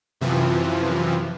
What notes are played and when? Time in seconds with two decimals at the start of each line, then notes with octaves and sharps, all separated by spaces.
0.21 F#2 C3 E3 F3